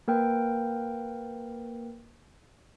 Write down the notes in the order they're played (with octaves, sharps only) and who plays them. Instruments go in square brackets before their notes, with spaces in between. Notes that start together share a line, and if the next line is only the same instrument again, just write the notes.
[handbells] A#3 A#4 B4 G5